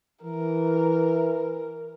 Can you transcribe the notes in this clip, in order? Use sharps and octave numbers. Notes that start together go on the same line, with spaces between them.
E3 A#4